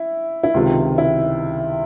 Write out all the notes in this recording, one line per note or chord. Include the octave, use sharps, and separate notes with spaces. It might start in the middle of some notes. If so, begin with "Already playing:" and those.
Already playing: E4
E4
C#2 C3 D#3 F4
E4